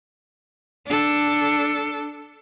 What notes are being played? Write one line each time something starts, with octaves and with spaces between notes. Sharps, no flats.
D4 A4